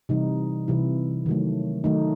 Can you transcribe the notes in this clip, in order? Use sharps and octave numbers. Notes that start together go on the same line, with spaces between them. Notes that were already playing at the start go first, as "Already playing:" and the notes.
C3 E3 G3 D#4
C3 E3 G3 E4
D#3 F#3 A3
D#3 F#3 A3 D#4